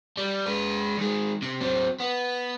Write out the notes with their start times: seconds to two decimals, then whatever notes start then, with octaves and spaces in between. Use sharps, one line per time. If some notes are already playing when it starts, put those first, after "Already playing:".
0.17 G3
0.46 G#3 B4
0.98 D#3 G#3
1.42 C3
1.61 F#3 C4
2.00 B3